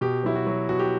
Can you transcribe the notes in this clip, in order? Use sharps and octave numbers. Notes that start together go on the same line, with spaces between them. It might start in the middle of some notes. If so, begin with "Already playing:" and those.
B2 G4
F#3 E4
F#4
F#3
B2 F#4
G4